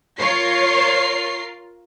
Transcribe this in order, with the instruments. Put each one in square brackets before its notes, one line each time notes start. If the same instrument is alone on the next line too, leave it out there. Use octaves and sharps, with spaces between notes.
[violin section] F4 A#4 C7 [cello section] C#5